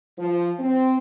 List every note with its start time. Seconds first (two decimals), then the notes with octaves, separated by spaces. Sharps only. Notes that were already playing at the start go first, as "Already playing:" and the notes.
0.18 F3
0.59 C4